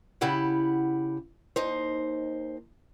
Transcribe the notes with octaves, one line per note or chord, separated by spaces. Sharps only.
C#3 E4 G4 F#5
D#2 D#4 C5